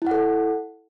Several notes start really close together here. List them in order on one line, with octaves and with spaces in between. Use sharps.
E4 F#5 A4